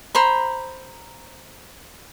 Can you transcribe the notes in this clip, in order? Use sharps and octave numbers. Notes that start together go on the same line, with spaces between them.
C5 A#5 B5